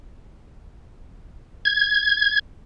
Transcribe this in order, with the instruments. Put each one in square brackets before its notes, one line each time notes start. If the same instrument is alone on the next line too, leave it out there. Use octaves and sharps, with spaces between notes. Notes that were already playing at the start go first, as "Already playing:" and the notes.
[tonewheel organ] G#6